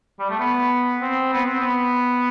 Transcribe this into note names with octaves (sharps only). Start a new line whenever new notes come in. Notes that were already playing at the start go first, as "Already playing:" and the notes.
G3
A3
B3
C4
B3
C4
B3